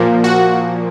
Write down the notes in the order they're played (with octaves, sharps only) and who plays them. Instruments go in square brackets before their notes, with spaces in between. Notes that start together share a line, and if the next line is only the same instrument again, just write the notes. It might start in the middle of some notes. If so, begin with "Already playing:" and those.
Already playing: [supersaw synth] A#2 F3 A#3
F#4